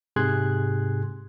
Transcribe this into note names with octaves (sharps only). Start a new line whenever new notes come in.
G#2 C3 G#4 C6 F#6 G#6